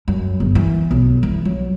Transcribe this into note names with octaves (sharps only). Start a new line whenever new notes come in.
F#2
G1
E3
B1
E3
F#3